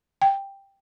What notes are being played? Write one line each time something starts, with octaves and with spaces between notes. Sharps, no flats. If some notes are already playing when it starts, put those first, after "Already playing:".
G5